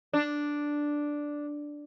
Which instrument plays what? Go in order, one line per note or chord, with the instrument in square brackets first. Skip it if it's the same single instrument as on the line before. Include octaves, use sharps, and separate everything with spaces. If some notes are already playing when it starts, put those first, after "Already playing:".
[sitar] D4